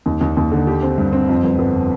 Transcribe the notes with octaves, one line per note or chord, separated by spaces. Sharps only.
D#2
D#2
D#2
D3
G4
C4
G2
C4
F2
G1
G1